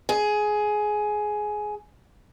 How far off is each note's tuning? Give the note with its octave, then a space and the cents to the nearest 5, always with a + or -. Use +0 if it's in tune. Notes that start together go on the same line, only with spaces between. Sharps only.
G#4 +15